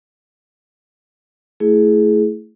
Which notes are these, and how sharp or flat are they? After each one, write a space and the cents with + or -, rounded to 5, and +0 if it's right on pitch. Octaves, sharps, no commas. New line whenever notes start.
A3 +5 E4 +0 G#4 +15